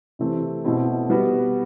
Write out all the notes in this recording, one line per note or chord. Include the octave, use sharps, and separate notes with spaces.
C3 E3 A3 C4
B2 A3 C4 E4
G3 B3 F#4